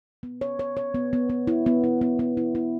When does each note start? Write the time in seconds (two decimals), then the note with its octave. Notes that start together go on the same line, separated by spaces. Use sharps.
0.23 B3
0.41 C#5
0.59 C#5
0.77 C#5
0.95 B3
1.13 B3
1.30 B3
1.47 E4
1.66 B3
1.84 E4
2.01 B3
2.19 B3
2.37 E4
2.55 E4